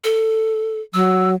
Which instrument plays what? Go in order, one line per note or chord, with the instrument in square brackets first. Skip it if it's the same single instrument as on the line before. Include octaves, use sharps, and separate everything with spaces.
[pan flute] A4
[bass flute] F#3 [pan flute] E6